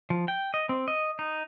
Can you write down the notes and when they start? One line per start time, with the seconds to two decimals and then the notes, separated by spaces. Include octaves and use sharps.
0.10 F3
0.28 G5
0.54 D#5
0.69 C4
0.88 D#5
1.19 D#4